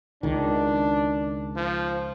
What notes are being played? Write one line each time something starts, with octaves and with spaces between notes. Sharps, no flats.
C#2 D#3 D4
F3